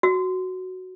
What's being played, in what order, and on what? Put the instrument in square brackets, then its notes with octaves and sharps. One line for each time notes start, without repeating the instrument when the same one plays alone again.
[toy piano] F#4